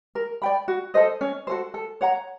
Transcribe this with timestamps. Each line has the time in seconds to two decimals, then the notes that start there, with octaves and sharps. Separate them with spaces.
0.15 A#4
0.42 D5 G5 B5
0.68 F#4
0.94 A4 C5 D#5
1.21 C#4
1.47 F#4 A4 C5
1.74 A4
2.01 C#5 F#5 A#5